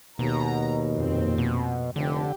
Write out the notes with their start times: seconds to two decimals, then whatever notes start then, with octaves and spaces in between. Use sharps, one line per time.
0.19 D#2 B2 A#5
0.93 F2 A#2 C4
1.38 B2
1.96 F1 D3 G4